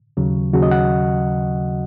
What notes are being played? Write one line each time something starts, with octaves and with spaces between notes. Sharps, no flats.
D#2 C#3 F#3
D#2 C#3 F#3 F#4
D#5
F#5